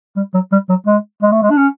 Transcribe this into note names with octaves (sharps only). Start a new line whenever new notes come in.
G3
F#3
G3
F#3
G#3
G#3
A3
G#3
D4
C#4